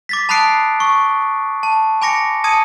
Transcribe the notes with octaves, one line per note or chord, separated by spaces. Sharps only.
D6 A6 B6
A5 B5 D#6 F#6 C7 D7
C#6
A5
G#5 B5 D6 A#6 C#7
A5 D#6 G#6 C#7 D#7